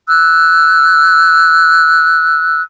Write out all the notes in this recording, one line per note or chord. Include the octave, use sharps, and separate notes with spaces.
E6 F#6